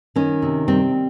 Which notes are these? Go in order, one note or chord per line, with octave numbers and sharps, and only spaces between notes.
D#3 C#4
C3
G3 C4